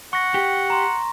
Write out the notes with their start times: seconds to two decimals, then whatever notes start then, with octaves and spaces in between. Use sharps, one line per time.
0.13 F#5 C#6 A#6
0.34 G4
0.70 A#5 C6